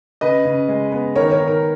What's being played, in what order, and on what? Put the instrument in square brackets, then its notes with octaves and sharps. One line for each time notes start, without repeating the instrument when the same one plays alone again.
[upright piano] C#3 B4 D#5
C#3
G#3
B3
D#3 A#4 C#5
A#4 C#5
D#3
A#4